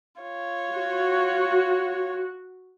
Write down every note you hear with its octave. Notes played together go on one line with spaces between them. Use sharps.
F4 C#5
F#4